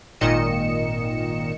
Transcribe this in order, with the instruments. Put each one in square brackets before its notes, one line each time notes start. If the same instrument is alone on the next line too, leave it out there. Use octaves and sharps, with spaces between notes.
[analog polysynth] G#1 A#2 D#3 D#5 C#7 E7